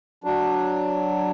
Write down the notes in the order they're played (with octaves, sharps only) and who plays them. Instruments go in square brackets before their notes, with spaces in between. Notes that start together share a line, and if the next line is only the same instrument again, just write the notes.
[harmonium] F#3 D4